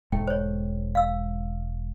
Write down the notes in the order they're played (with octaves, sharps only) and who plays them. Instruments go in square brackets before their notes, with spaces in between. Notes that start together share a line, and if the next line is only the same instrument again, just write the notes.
[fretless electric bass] E1 G#2 A3 [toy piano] G5
[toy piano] C5 C#5
F5 E6